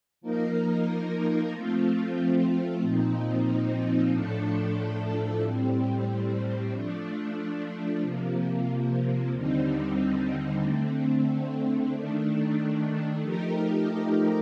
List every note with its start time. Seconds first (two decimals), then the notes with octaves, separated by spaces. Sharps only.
0.21 F3 A#3 D#4 A#4
1.51 F3 A3 C4 F4
2.81 A#2 F3 C4 D#4
4.11 A2 F3 A3 D4 A4
5.41 A2 G3 C4
6.71 F3 A3 D4
8.01 C3 F3 A#3
9.32 D#2 D3 G3 C4 D#4
10.62 D3 A3 C4
11.92 D#3 A3 D4
13.22 F3 A3 D#4 G4 A#4